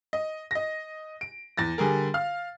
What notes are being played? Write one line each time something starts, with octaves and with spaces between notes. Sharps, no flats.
D#5
D#5 A#6
D7
E2 A6 A#6
D3 G3 G#4 A#4
F5 F6